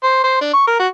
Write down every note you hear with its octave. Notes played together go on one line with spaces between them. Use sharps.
C5
C5
D4
C#6
A#4
F#4